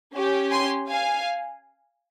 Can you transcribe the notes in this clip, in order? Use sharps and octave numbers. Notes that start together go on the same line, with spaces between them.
C#4 G4
G#5 C6
F5 G#5